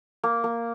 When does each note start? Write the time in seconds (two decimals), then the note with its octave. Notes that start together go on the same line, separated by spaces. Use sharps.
0.23 A#3
0.44 A#3